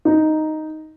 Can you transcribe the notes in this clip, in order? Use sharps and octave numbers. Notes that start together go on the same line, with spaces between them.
D#4